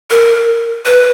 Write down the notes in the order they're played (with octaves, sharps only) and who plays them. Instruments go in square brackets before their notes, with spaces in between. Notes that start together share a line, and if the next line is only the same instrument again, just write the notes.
[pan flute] A#4
B4